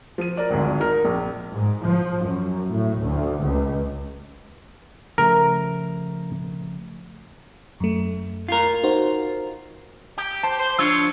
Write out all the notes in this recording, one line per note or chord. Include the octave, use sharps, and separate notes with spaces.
F3 D#7
A#4 D5
G#1 D2 G#2
D#4 A#4
A#1
G#2
F3
F#2
A2
D2
C#2
C#3 F3 A3 A#4
F#2 A3
F4 A#4
D#4 F#4 C5
G4
C5 A5
C5
F3 D4 F4 C#5 E6